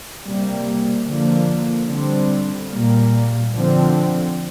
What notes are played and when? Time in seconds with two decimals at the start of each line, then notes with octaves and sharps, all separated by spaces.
0.23 C3 G3 A#3
1.06 D3 F3 A#3
1.88 D3 G3 C4
2.70 A#2 G3 A#3
3.53 D3 F3 C4